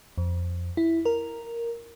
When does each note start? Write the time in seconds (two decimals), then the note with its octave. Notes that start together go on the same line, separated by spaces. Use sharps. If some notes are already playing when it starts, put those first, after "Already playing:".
0.18 F2
0.77 E4
1.05 A#4